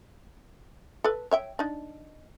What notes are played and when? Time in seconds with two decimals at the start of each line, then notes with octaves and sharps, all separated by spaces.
1.04 A4 B4
1.31 C#5 E5 G5
1.59 D4 D#4